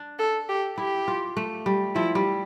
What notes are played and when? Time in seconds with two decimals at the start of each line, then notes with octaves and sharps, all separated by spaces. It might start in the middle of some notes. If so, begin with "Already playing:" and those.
Already playing: D4
0.19 A4
0.49 G4
0.78 E4 G4
1.08 F4
1.37 A3
1.66 G3
1.95 F3 E4
2.15 G3